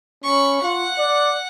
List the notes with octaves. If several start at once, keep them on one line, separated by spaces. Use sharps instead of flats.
C#4 B5 C#6
F4 F#5
D5